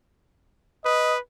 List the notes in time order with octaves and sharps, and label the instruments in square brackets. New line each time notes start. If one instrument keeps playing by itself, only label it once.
[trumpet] B4 [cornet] D#5 [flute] D#6